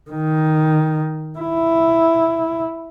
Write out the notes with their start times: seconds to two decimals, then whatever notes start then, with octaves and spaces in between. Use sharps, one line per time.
0.10 D#3
1.39 E4